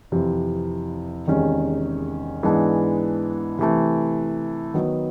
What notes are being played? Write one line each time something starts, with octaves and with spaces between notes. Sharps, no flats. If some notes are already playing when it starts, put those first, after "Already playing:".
F2 C3 E3
E2 C3 D#3 G#3 C#4
G#2 E3 G#3 B3 D4
C3 E3 A3
D#3 F#3 B3